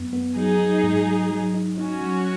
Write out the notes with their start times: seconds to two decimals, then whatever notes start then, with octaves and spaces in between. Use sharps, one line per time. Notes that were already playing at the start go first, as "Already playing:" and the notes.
Already playing: F#2 B3
0.13 B3
0.36 F#3 D#4 G#4
0.60 F#3
0.83 G#2
1.07 F#3
1.31 F#3
1.54 D#4
1.77 C#4 D#4 F#4
2.01 F#3